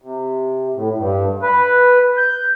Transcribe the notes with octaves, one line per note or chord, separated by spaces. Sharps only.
C3
A2
G2
B4
G6